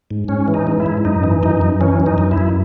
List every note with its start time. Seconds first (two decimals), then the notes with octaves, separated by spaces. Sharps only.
0.11 G#2
0.28 G#2 C#4
0.48 E3
0.54 D#4
0.67 G#2
0.80 E4
0.86 G#2
1.05 F#2 D#4
1.23 E3
1.43 F#2 D#4
1.61 F#2
1.81 E3 C#4
2.00 F#2
2.06 D#4
2.18 F#2
2.31 E4
2.38 F#2